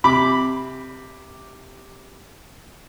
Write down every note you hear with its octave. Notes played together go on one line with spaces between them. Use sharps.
C3 B5 D6